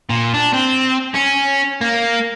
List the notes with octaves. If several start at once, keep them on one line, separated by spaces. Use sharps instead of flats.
A#2
D4
C4
C#4
A#3